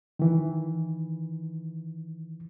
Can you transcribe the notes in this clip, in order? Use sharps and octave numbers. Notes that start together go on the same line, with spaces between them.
D#3 E3